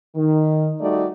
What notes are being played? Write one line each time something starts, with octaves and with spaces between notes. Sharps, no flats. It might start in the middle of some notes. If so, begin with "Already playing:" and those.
D#3
G3 A3 D#4 F#4 D5